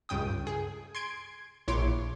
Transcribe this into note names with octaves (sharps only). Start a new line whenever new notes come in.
C#2 G2 C#3 G5 D#6
G#4
C6 G#6 D7
A#1 E4 C#5 C6 D6